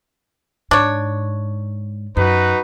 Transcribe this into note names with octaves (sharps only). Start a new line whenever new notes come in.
G#2 D4 C#5
F#2 D#4 F#4 B4